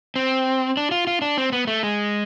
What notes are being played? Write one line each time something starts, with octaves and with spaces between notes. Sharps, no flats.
C4
D4
F4
F4
D4
C4
B3
A3
G#3